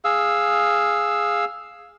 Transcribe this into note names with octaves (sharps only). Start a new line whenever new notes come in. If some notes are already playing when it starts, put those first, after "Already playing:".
G#4 F5 E6